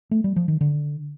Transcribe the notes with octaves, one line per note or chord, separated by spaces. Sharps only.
A3
G3
F3
D#3
D3